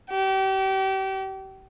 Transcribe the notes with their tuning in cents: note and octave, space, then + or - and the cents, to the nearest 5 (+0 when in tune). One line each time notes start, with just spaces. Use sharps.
G4 -35